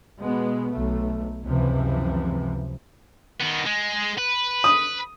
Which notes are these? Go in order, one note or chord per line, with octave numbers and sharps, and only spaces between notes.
B2 G#3 B3
B1 A3
C#2 F#2 C3 E3 F3
D#3 B3
G#3
B4
D#6